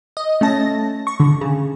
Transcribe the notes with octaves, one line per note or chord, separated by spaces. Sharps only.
D#5
A3 C#4 A5 A#6
C#6
D3
C#3